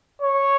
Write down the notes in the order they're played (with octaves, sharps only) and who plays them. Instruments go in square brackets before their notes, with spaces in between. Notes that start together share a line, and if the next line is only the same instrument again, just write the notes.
[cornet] C#5